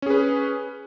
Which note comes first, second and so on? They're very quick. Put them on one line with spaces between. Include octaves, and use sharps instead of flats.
C#4 G#4 B4